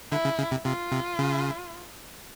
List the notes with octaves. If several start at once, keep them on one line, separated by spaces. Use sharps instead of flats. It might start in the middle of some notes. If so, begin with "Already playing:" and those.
D3 E4
C#3
C#3
C3
C3 F4
C3
C#3